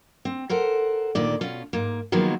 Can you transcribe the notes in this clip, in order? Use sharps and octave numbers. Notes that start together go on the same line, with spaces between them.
C4
A4 A#4 C5 F#5
D2 A#2 D#3 D5
B2 C#4 F4
G#2 A#3
D#3 F3 F#3 G#3 A#3 B3